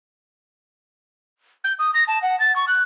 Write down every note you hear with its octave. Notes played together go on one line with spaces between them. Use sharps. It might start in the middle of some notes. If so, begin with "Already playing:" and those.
G6
D#6
A#6
A5
F#5
A6
C#6
F#6